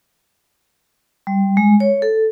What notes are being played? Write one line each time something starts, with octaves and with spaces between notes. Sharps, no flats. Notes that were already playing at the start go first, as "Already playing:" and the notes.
G3
G#3
C#5
A4